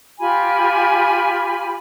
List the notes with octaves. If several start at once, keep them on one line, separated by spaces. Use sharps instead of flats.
F4 G4 G#5 B5